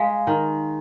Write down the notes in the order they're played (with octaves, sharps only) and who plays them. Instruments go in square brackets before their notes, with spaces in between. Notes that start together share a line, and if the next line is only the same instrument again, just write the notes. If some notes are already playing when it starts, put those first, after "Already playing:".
Already playing: [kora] G#3 [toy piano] F5
[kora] D#3